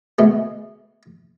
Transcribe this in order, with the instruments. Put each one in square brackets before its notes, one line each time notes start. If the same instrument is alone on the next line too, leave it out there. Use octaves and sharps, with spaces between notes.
[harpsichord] B2 G#3 A3